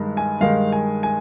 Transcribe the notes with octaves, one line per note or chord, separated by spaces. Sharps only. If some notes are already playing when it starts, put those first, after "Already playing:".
Already playing: G2 D#3 G#3 D#4
G#5
G2 D#3 G#3 D#4 F5
G#5
G#5